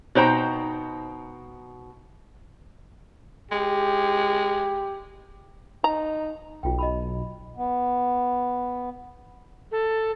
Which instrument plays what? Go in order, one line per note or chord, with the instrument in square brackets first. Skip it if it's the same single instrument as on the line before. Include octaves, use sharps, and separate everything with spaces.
[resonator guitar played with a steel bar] B2 D#4 C5 G5 A#5
[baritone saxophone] G#3 [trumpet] G4
[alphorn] D#4 [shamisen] A#5
[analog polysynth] B1 [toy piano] F4 G5
[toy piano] D#5 A5 B5
[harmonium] B3
[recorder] A4